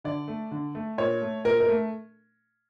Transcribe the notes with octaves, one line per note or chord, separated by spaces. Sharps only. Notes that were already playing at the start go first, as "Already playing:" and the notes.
D3 D5
A3
D3
A3
A#2 C#5
A3
A#2 A#4
A#4
A3